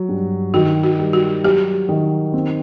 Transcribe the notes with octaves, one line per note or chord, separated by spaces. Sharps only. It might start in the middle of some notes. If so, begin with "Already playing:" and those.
Already playing: F#3
G2
D#3 F#4
F#4
G3
F#4
F#3 G4
D#3
C4